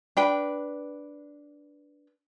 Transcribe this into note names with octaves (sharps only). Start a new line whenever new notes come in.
D4 B4 G5 B5